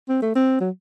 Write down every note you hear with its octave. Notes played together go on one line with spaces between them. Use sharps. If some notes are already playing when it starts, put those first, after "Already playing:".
C4
A3
C4
F#3